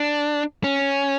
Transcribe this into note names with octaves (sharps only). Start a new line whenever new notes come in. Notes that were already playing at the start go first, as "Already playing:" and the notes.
Already playing: D4
C#4